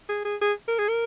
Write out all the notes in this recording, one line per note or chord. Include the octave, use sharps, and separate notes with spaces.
G#4
G#4
G#4
A#4
G#4
A#4